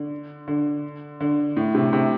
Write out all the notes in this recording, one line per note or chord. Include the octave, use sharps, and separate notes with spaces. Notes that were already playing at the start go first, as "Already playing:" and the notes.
Already playing: D3
D3
D3
A2
C3
C3